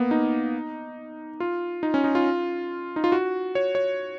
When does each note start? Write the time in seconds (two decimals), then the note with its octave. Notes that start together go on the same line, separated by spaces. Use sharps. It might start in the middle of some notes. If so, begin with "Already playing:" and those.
Already playing: A#3 B3
0.11 D#4
1.40 F4
1.83 D#4
1.94 C#4
2.04 D#4
2.15 F4
2.96 D#4
3.04 F4
3.12 F#4
3.55 C#5
3.75 C#5